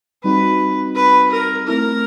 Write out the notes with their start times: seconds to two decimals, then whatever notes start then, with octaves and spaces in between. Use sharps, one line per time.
0.24 G3 C4 D#4 F#4 B4
0.96 B4
1.31 A#4
1.67 A3 C4 E4 A#4